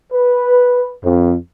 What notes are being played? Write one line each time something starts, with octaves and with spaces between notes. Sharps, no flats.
B4
F2